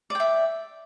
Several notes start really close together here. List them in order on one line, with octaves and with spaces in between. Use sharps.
D5 G5 E5